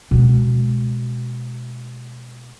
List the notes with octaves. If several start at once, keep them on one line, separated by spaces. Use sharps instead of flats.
B2 G#3